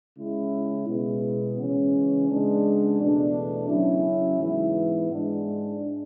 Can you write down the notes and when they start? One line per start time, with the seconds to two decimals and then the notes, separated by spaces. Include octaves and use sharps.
0.17 C#3 G#3 C#4 E4
0.88 B2 G#3 B3
1.59 C#3 E3 G#3 C#4
2.29 C#3 G#3 B3 D4
2.99 E2 B2 A3 D4
3.69 C#3 F#3 C#4 E4
4.40 G#2 E3 B3 E4
5.10 G#2 G#3 D4